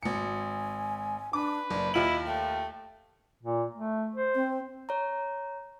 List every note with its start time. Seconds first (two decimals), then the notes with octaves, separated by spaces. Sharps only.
0.03 G#1 G#5 C#7
1.33 D4 B4 D6
1.70 F#1 D5
1.94 D#2 E4 F4 D#5 F#7
2.26 A3 G5
3.43 A#2
3.75 A3
4.15 C5
4.35 C4
4.89 C#5 A#5